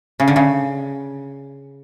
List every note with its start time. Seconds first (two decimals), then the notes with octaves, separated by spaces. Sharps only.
0.20 C#3
0.28 D3
0.36 C#3